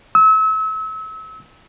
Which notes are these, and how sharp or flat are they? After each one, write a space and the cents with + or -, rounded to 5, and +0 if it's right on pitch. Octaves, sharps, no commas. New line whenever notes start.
E6 -35